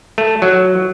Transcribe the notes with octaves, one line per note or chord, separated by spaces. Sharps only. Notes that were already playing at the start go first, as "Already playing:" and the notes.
A3
F#3